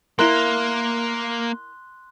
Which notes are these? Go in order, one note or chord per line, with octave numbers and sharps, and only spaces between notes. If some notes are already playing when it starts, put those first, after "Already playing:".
A#3 E4 A#4 C6 F#6 G7